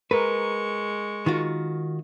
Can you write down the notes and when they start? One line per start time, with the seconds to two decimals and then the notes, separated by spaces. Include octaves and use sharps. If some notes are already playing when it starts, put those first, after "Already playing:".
0.11 G#3 A#4 B4 C#6
1.26 D#3 F4 F#4